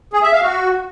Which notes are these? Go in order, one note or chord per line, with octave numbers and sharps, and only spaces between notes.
G#4
E5
F5
F#4